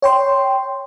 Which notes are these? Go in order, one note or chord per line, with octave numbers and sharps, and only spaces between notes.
C#5 G5 C6